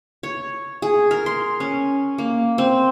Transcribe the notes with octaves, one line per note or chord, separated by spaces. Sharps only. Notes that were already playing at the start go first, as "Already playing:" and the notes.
C#5
G#4
A#4
C6
C#4
A#3
C4